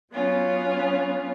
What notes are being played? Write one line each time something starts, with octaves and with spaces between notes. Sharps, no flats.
F#3 B3 C#4 F4